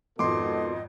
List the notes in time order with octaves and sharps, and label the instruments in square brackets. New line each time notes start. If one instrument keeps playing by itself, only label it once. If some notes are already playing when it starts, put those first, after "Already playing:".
[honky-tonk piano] G#1 F2 [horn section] B2 D#3 A4 [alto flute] D#5 [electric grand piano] C6 D6